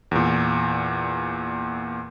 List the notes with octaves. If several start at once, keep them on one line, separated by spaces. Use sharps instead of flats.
E2 A#2